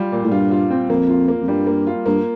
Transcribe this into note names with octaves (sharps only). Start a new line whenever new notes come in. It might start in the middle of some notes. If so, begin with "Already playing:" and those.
Already playing: G3 F4
A#2
A2
G2 F4
F4
C4
F2 A#3
F4
A#3
F2
G2 G3
A#3
F4
G2 A#3